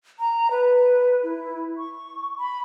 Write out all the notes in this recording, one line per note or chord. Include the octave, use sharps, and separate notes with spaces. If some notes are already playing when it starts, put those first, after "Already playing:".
A#5
B4
E4
C#6
B5